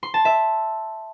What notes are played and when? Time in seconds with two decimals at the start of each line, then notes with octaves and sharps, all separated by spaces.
0.03 C6
0.14 A5
0.25 E5